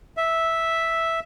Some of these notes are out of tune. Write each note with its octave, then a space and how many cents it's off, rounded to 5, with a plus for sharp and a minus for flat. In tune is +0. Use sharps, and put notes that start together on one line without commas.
E5 -5